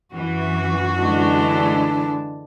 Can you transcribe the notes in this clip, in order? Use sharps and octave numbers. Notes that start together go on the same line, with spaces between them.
F#2 E3 F#4
D3 E3 G#3 D4